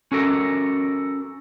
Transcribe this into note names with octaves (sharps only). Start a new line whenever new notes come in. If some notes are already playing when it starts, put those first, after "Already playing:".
C#4 F#4 A4 A#4